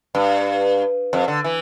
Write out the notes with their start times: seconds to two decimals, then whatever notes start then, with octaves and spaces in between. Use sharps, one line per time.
0.15 G2
1.13 F2
1.28 D3
1.44 E3